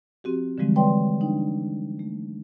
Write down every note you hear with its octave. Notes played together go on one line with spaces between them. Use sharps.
F3 C4 F#4 G4
D3 E3 F3 G3 G#3 C4
B4 C#5 D5 G5 C6
D3 D4 D#4 G5
A3